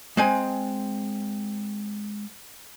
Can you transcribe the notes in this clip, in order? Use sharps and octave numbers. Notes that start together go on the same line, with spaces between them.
G#3 C4 G#5